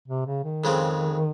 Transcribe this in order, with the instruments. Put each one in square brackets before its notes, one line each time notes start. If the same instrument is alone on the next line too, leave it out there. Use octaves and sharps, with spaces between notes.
[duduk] C3
C#3
D#3
[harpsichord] F2 C#3 G#3 C4